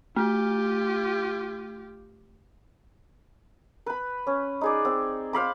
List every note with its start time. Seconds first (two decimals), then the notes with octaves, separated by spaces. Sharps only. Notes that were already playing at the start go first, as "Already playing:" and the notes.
0.16 A3 F4 G4
3.86 B4 B5
4.27 C#4
4.61 D#4 G#4 D5
4.85 C4
5.33 C5 F5 B5 D6